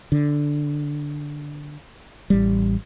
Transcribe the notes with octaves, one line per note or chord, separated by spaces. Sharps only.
D3
A1 G3